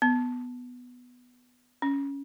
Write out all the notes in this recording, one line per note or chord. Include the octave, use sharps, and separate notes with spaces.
B3
C#4